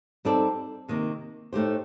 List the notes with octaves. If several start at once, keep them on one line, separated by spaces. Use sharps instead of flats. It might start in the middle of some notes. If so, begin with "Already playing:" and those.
G3 C4 D#4 A4 D5
C3 D#3 A#3
A2 A3 D#4 G4 C5